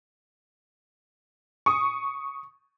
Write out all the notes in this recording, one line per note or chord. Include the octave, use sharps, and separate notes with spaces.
C#6 D#6